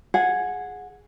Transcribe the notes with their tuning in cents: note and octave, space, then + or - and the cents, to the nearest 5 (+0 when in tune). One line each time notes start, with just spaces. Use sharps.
G#4 +0 F#5 -20